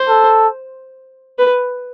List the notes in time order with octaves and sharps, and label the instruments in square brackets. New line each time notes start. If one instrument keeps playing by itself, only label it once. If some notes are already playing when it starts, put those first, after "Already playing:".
Already playing: [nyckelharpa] C5
[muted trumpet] A4
[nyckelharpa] B4